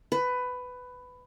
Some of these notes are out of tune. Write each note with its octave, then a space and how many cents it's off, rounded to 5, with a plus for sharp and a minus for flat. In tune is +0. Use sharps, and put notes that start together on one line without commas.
B4 +15